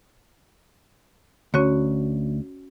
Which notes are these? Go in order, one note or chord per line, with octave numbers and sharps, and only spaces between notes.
D2 C#4 F#4 C#5